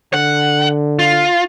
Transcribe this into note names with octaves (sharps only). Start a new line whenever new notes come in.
D3 F#5
F4